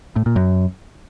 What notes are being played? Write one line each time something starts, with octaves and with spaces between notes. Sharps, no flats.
A2
A#2
F#2